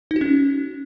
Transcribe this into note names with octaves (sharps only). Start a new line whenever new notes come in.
D#4
F#4
C#4